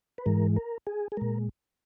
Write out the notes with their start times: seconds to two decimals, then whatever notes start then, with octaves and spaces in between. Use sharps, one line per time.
0.18 B4
0.26 G#2 E3 G#3 A#4
0.56 A#4
0.87 G#4
1.12 G#4
1.17 A#2 G#3 A#4